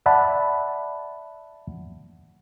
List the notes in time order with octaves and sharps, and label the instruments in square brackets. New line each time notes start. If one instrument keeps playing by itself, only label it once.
[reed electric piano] D5 E5 F#5 A5 B5